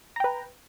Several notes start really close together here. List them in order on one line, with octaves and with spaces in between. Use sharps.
A#5 G5 B4